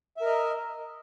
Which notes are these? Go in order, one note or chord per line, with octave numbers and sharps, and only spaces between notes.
A#4 D#5 E5